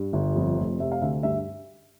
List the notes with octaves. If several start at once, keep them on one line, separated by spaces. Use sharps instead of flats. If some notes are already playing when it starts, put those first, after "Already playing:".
Already playing: G2
G1
F2
F1
C3 E5
F5
D2 E5
G2 E5